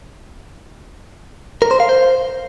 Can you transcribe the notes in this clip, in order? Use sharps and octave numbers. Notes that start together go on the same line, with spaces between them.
A#4
C5
F5
C5